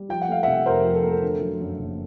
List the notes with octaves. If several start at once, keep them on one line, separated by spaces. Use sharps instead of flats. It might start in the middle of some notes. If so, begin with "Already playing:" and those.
Already playing: G3
F3 G5
F#5
A3 F5
C3 E5 F#5
F2 A#4 C5
F3
A4
A3 A#4
A4
D3
F#3
F#2
F#1